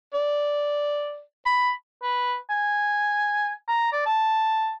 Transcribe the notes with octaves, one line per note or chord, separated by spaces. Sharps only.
D5
B5
B4
G#5
A#5
D5
A5